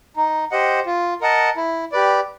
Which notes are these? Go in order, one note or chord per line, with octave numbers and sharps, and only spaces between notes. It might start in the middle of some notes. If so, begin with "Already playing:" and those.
D#4
G4 C5 D#5 F#5
F4
A#4 D#5 F#5 A5
E4
G4 B4 D5